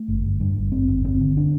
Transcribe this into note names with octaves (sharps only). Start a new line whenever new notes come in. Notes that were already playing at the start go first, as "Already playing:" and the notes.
Already playing: A3
G1
G1
G2
G1
G1 C4
G1
G1 C4
D3
D4